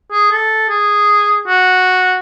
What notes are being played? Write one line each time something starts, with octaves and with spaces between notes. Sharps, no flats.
G#4
A4
G#4
F#4